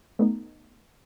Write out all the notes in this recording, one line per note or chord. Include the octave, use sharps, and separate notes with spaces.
A3 B3 D#4